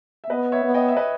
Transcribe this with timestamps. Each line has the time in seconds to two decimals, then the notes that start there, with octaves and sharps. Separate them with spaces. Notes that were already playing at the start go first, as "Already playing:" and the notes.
0.24 E5
0.30 B3 B4 D#5
0.52 C#5 E5
0.64 B3
0.74 D#5 G5
0.88 E5
0.97 B4 D#5